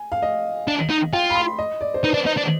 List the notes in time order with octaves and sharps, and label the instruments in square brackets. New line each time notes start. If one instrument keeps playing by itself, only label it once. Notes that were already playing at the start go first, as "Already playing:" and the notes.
Already playing: [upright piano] G#5
F5
D#5
[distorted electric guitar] D4
D#4
[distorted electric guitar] F4 [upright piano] G5
[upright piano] B5
C6
D#5
D5
C5
[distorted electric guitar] D#4 [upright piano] B4
[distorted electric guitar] D4
D#4
D4